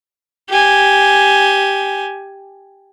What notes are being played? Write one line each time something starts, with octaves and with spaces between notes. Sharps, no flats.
G4 G#5